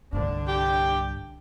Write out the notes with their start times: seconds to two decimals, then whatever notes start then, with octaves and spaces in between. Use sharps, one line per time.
0.13 C2 G2 D3 D4
0.48 G4